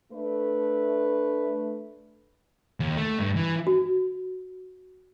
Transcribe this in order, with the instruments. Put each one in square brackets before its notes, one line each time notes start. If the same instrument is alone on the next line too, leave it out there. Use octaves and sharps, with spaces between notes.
[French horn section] A3 D4 B4
[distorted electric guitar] D#2
A3
G2
E3
[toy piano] F#4